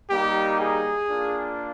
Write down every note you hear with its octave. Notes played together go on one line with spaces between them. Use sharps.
G3 A#3 D#4 G4
G#4
A#3 D4 F4